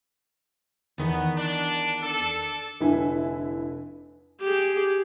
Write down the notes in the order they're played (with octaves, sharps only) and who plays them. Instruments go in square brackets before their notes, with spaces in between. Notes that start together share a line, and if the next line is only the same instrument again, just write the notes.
[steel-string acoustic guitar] E2 D#3 [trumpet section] B3
[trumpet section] D4
D4 A4
[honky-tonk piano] F1 D3 E4 G#5
[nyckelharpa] G4 G#4